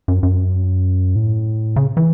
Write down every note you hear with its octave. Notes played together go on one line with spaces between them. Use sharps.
F#2
F#2
A2
C#3
E3